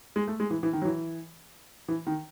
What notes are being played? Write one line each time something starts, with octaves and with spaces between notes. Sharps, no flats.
G#3
A3
G#3
E3
E3
D#3
F#3
E3
E3
D#3